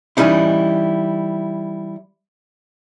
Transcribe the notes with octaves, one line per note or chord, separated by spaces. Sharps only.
E3 F#3 G3 C#4 D#4 E4